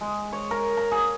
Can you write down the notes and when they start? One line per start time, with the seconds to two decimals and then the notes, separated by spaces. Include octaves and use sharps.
0.01 G#3
0.32 C#5
0.51 A#4
0.77 A#5
0.92 G#4